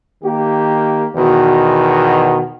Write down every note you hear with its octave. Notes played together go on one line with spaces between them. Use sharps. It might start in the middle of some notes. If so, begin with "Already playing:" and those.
D#3 A#3 G4
E2 B2 D#3 F#4